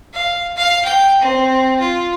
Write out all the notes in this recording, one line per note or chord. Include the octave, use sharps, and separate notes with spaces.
F5
F5
G5
C4
F4